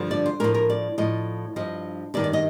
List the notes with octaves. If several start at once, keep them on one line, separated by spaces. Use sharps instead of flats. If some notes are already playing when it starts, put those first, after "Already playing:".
Already playing: G2 D3 F3
D5
C5
A2 F3 A#4
A#4
D5
A2 F3 D#5
G2 F3 D#5
G2 D#3 D5
D5
D#5